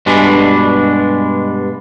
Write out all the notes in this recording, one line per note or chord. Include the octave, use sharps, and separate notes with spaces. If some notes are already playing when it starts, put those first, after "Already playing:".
G2 B2 G#3 D4